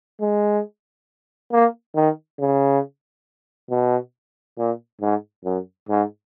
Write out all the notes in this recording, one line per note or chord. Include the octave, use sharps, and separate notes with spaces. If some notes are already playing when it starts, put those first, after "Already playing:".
G#3
A#3
D#3
C#3
B2
A#2
G#2
F#2
G#2